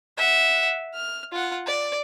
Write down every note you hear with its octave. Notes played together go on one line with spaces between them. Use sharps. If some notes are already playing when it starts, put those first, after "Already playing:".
E5 F#5
F6
F4 F#5
D5